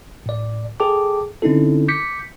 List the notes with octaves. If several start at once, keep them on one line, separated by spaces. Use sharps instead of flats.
A2 D5
G#4 A4 G5 A5 D6
D3 C4 C#4 D#4 E4 A4
D6 G6 B6 C#7